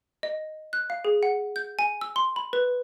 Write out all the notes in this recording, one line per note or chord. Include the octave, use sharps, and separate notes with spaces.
D#5
F#6
F5
G#4
F#5
G6
G#5
E6
C6
B5
B4